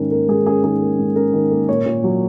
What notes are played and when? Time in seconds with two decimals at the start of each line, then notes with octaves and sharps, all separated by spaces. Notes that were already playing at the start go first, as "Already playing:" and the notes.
Already playing: G#2 D#3 C#4 A#4
0.11 A#3 A#4
0.29 G#2 G#4
0.46 C#4 G#4
0.64 D#3 G#4
0.81 A#3
0.99 G#2
1.16 C#4 A#4
1.33 D#3
1.51 A#3
1.69 A#2 C#5
1.86 A#2
2.04 F#3